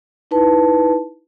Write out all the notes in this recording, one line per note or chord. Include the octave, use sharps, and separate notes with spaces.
D#4 E4 B4 A5